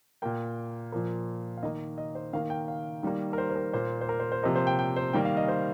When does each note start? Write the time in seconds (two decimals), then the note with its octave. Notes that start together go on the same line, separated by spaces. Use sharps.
0.22 A#2 A#3 G5
0.92 A#2 F3 A#3
1.57 F5
1.63 D#3 A#3 D#5
1.98 D#5
2.15 C5
2.33 D#3 A#3 F5
2.50 G5
2.68 F5
3.03 D#3 G3 A#3
3.33 A#4
3.38 C5
3.50 C5
3.56 A#4
3.73 A#2 A#3 C5
4.01 C5
4.09 A#4
4.20 C5
4.32 C5
4.43 C3 F3 A#3 D#5
4.56 C5
4.67 G5
4.79 G5
4.96 C5
5.13 D#3 G3 A#3 G5
5.25 F5
5.37 D#5
5.48 C5